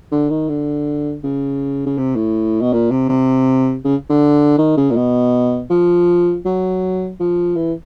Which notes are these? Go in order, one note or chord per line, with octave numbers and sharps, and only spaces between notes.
D3
D#3
D3
C#3
C#3
C3
A2
B2
A#2
C3
C3
C#3
D3
D#3
C#3
A#2
B2
F3
F#3
F3
E3